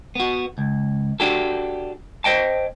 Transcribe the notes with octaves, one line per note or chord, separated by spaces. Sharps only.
B3 F#4
C#2
D4 F#4 G4 A4
C5 D#5 G5 A5